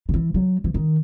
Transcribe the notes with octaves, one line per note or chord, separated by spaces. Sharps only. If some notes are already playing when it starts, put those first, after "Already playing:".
D#3
E3
F#3
E3
D#3